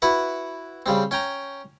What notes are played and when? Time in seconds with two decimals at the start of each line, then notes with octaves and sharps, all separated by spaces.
0.02 E4 F#4 B4 F#5
0.86 C#3 G3 C4
1.11 C#4 G5 A#5